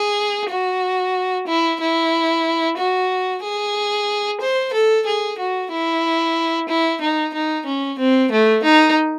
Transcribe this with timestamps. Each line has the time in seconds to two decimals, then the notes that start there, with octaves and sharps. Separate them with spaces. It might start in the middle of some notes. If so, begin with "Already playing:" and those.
Already playing: G#4
0.50 F#4
1.47 E4
1.81 E4
2.78 F#4
3.43 G#4
4.41 C5
4.73 A4
5.06 G#4
5.38 F#4
5.71 E4
6.69 E4
7.01 D#4
7.34 D#4
7.66 C#4
7.99 C4
8.32 A3
8.64 D#4